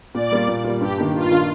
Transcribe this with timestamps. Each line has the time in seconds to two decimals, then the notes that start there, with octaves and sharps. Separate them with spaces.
0.14 A#2 D5
0.31 G3 A#3 F4
0.48 A#2
0.64 G3 A#3 F4
0.81 G2 G4
0.98 D#3 A#3 D4
1.14 G2 F4
1.31 D#3 A#3 D4